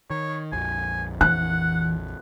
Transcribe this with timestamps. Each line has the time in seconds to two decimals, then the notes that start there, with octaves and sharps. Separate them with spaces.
0.10 D#3 C#5
0.52 A#1 F2 G#5
1.21 E3 F#5 F#6